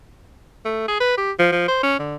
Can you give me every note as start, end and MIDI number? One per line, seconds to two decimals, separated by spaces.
0.65 0.86 57
0.88 0.99 68
1.00 1.17 71
1.18 1.32 67
1.39 1.48 53
1.52 1.67 53
1.68 1.80 72
1.83 1.97 61
1.99 2.16 50